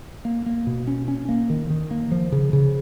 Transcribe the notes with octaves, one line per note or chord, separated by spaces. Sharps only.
A#3
A#3
B2
C#4
C#4
A#3
D#3
D#3
A#3
F3
C#3
C#3